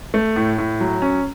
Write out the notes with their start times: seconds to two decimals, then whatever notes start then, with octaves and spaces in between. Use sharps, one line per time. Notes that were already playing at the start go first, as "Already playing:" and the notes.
0.14 A3
0.36 A2
0.58 A2
0.81 F#3
1.02 C#4